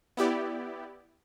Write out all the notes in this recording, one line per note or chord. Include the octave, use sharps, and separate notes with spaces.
B3 E4 G4 D5